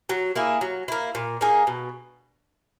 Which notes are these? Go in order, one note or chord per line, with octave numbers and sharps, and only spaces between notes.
F#3
A#3 E4 G#4
F#3
A#3 E4
A#2
A#3 D#4 G#4
B2